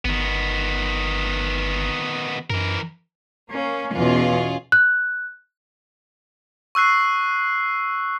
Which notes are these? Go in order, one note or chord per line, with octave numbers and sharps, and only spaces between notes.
G1 D#3 B3
F#2 E3 A#4
A#3 C#4
E2 B2 C#4 F4 G#4
F#6
C#6 E6 F#6 C7